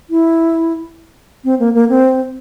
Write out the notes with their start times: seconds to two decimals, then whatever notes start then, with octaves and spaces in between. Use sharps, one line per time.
0.10 E4
1.45 C4
1.59 A#3
1.74 A#3
1.89 C4